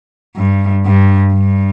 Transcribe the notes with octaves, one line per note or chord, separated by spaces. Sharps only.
G2
G2
G2